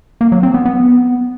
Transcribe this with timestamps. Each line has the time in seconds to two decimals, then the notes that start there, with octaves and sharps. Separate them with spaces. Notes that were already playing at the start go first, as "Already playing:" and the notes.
0.21 A#3
0.32 F#3
0.43 C4
0.54 B3
0.65 B3